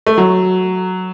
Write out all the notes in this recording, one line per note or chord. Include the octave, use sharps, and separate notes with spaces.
A3
F#3